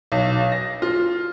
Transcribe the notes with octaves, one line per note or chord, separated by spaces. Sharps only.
B1
A#6
F4